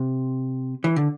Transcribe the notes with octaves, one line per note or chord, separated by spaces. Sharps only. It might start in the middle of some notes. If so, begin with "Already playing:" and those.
Already playing: C3
E3
D3